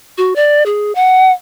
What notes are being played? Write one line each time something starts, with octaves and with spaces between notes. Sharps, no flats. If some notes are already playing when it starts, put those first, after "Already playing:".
F#4
D5
G#4
F#5